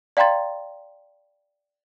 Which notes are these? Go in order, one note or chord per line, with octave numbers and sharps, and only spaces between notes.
D5 F5 G5 A#5 C6 A6